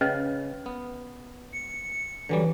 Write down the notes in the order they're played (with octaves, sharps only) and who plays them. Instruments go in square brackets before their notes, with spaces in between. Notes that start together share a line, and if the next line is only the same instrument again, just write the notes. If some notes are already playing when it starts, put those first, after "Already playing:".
[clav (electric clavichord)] C#3 [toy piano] C#4 B4 D#5
[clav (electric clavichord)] B3
[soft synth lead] C#7
[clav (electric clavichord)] D3 F#3 G3 [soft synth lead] E3